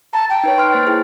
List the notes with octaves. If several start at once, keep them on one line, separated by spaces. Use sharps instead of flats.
A5 A#5
G5
D#4 B4 C#5
C6 F6 F#6
A#3 C5 A6
E4 G#4